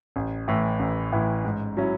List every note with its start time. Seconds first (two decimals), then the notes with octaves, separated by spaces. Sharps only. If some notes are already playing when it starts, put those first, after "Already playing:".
0.16 A1
0.48 A2 E3
0.79 A1
1.13 A2 E3
1.45 G#2
1.77 F#3 C#4 E4